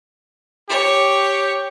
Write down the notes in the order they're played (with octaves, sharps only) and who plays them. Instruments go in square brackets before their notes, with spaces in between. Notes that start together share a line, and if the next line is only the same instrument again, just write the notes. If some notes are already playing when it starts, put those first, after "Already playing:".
[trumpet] G4 [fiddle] C#5